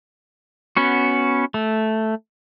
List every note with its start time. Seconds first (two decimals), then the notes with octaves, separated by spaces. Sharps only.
0.77 B3 C#4 F#4
1.54 A3